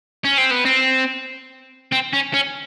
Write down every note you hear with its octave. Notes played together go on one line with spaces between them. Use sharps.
C#4
C4
B3
C4
C4
C#4
C#4